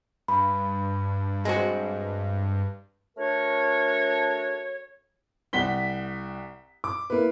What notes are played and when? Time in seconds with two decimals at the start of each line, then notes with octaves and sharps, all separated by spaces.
0.28 G2 B5
1.45 G#3 C4 F#4
3.17 A3 D4 F#4 A#4 C#5
5.53 C2 F#5 B6 G7
6.84 D6
7.10 A#3 E4 B4